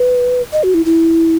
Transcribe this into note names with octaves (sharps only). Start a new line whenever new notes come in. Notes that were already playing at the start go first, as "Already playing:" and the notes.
Already playing: B4
D#5
F#4
E4
E4